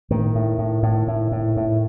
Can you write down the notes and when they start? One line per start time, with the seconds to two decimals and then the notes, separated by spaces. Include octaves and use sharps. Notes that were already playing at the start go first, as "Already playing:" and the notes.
0.10 A2 D#3
0.35 A2
0.58 A2
0.83 A2
1.08 A2
1.32 A2
1.57 A2